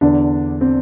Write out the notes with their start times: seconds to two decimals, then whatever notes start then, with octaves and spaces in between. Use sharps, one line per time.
0.01 E2 D3 D4
0.61 C4